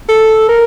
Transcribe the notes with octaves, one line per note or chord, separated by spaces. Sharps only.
A4
A#4